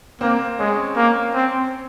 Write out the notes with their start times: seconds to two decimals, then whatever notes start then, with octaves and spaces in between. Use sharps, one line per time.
0.21 A#3 C4
0.59 G#3 C#4
0.96 A#3
1.34 C4